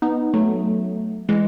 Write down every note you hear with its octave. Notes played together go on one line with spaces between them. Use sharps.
B3 D#4
F#3 A3
E3 G#3